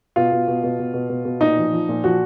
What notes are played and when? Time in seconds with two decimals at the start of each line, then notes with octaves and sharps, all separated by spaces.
0.16 B2 F4
0.32 B2
0.48 B2
0.64 B2
0.79 B2
0.94 B2
1.09 B2
1.25 B2
1.41 A#2 D#4
1.57 F3
1.73 F3
1.89 A#2
2.04 F3 F#4